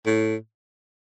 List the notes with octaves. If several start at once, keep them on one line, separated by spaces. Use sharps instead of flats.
A2